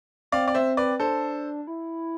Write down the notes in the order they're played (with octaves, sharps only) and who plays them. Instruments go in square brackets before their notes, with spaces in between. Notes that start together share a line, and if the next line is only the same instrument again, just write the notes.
[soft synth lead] C4 [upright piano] D5 F5
[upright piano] D5
C5 E5
B4 D5
[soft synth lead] D4 [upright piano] A4 C5
[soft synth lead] E4